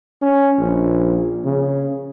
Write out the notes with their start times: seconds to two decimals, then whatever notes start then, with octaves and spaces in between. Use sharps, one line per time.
0.22 C#4
0.59 A#1
1.45 C#3